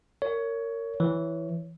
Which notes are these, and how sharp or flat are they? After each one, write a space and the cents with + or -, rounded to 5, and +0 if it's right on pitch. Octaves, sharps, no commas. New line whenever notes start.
A#4 -20 C#5 +15
E3 +0 C#5 +0